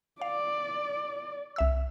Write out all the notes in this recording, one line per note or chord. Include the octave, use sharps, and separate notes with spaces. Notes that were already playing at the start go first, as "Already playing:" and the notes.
D5 F5
C2 E5 E6